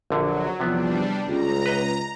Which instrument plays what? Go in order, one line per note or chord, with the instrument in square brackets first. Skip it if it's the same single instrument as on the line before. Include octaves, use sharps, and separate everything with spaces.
[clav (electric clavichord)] A#1 D3 [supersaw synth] F#3
[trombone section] E2 F3 [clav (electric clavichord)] C3 B3 [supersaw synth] G3 D4
[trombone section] C#2 [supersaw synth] A#5
[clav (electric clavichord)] B4 D#5